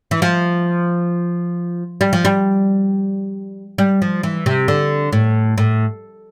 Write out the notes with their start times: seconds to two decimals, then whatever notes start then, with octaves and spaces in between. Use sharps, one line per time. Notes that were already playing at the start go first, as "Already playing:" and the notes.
0.11 E3
0.22 F3
2.01 G3
2.13 F3
2.25 G3
3.78 G3
4.02 F3
4.23 E3
4.46 C3
4.68 D3
5.13 A2
5.58 A2